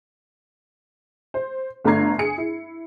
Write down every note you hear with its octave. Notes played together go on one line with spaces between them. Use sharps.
C5
G1 A3 D4 A#5 G#6 C7
G#4 C#7
E4